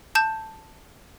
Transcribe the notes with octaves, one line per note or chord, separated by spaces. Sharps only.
A5 G6 E7